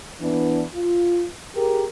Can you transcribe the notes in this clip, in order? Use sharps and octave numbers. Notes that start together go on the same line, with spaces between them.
E3 B3 D4
F4
G4 G#4 A#4